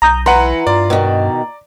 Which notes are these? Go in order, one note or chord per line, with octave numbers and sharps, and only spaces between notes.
B1 A#5 D#6 G6
E3 B4 F#5 A#5 C6
G2 F4 D5
B2 D#3